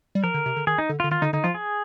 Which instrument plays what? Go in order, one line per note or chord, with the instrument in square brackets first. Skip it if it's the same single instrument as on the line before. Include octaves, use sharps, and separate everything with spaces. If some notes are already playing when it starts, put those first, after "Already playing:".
[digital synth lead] G3
[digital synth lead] F3 [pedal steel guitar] A#4
[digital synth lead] D3
C3
D3
[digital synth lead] D#3 [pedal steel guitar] G#4
[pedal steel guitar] D#4
[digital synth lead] D3
[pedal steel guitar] F4
[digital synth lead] D3
[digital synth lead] D#3 [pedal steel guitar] F4
[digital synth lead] D3 [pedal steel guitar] D#4
[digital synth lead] D3 [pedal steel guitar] D#4
[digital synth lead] F3 [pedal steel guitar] F4
[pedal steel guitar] G#4